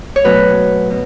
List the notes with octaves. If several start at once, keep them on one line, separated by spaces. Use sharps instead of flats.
C#5
B2 F#3 A3 C#4 B4
B2